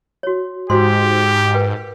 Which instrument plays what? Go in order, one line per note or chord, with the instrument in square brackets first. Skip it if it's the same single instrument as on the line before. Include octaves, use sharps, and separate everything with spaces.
[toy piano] F#4 C#5
[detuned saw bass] G#2 [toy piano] F#4 C5 C6 [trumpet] G4
[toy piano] A#4 B4 G5